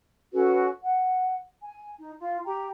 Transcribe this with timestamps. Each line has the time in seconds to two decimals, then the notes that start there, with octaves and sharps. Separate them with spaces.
0.33 C#4 F#4 A4 B4
0.83 F#5
1.64 G#5
1.97 D#4
2.18 F4
2.46 G4 G5 A#5